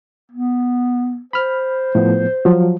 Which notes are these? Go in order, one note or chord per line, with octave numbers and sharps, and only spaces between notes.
B3
C5 B5 F6
A2 F3 B3
F3 F#3